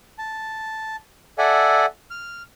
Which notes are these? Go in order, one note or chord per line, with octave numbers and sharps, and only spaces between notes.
A5
A4 D5 E5 F#5 G#5
F6